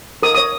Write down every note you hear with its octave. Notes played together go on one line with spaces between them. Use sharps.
A#4 D#6
C#5 D#6